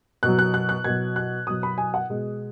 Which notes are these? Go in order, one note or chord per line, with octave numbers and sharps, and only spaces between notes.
B2 F#3 F#6
F#6
F#6
F#6
B2 F#3 G#6
F#6
B2 F#3 D#6
B5
G#5
F#5
B2 G#3